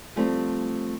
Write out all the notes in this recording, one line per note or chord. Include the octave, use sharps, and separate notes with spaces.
F3 G3 A3 C4